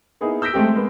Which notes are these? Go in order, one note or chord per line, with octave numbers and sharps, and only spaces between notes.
A#3 B3 D#4 E4 G#4
E6 G6 A#6 B6 D7
G#3 A3 C4 G4
G#3 A#3 B3